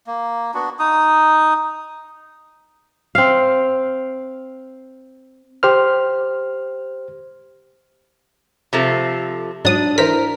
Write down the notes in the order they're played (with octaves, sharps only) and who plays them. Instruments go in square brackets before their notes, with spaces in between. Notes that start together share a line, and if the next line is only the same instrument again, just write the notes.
[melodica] A#3
B3 D4 F#4
D#4 D#6
[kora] C4 F5
[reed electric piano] G4 C5 F6
[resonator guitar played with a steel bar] C3 F3 A3
[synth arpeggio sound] G#2 F#3 D#6 [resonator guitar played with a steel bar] D4
[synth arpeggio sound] E3 C5 B6 [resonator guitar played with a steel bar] A#4